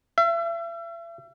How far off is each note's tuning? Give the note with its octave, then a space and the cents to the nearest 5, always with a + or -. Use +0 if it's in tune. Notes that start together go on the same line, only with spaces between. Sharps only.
E5 +40